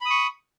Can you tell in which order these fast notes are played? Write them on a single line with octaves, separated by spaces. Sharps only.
B5 D#6 C#6